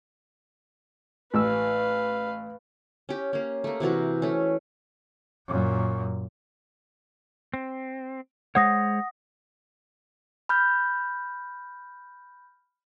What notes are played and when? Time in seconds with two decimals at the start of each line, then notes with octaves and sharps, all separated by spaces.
1.34 A1 B4 F5 E6
3.09 C#4 G4
3.33 A#3 C#4
3.64 A3 A#3
3.80 C3 E3 F#4 A#4
4.22 A3 C#4
5.47 F#2 A#2
7.54 C4
8.55 G#3 C5 C#5 F#5 D#6 A#6
10.49 B5 F6 G6